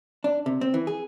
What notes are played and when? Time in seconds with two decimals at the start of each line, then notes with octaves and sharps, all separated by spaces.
0.24 D4
0.46 C3
0.61 C4
0.74 E3
0.87 G#4